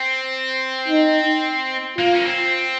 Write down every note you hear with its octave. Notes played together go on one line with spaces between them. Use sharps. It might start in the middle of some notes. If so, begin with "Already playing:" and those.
Already playing: C4
D#4
A#3 F4
C#4
C4